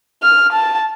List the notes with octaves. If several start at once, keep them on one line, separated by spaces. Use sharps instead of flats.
F6
A5